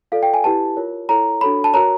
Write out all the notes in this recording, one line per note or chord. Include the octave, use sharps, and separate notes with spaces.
F4 A4 D5 F5
G5
G#5
E4 G4 B4 A5
F4 A#4 C#5
E4 A4 C#5 A#5
D4 F#4 A4 C#5 B5
A5
F#4 A#4 C#5 A#5